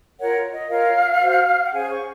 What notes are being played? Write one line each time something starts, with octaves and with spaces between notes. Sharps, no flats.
F4 A#4 C#5 F#5
D#5
F4 A#4 C#5 F5
F#4 C5
F#5
C#4 G#4 C5 G#5
C#6